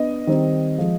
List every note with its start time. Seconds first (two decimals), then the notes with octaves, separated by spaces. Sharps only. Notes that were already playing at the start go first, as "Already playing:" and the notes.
Already playing: B3 D4 D#5
0.27 D#3 G3 C4 D#4
0.78 F3 G#3